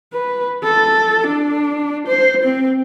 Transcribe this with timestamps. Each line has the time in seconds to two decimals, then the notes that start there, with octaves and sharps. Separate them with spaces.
0.13 B4
0.64 A4
1.27 D4
2.08 C5
2.44 C4